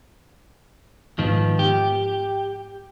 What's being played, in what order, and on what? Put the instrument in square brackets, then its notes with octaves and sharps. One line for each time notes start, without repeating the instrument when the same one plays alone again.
[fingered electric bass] G#2 [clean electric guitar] D#3 F3 B3
[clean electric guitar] G4